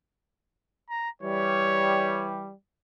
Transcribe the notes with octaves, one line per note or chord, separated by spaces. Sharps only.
A#5
E3 G3 C#5